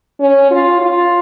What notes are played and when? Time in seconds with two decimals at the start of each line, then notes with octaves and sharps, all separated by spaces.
0.20 C#4
0.51 F4
0.82 F4